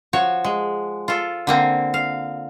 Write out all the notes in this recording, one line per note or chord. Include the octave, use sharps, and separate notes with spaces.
F3 F#4 C#5
G#3
F4 A4
D3 A#3 C4
F5